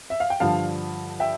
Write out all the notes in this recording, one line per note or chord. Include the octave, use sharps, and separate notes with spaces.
E5
F5
G5
G2 D3 F3 F5 A5
E5 G5